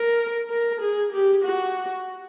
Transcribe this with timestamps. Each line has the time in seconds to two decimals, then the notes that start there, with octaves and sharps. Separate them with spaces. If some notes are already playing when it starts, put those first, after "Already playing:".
Already playing: A#4
0.50 A#4
0.81 G#4
1.12 G4
1.45 F#4